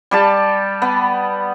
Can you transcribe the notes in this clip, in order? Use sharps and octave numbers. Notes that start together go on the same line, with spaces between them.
G3 G4 A5
B3